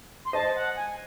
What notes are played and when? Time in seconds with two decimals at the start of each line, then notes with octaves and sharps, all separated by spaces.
0.25 C6
0.33 C5 D#5 A5
0.55 F#5
0.76 G#5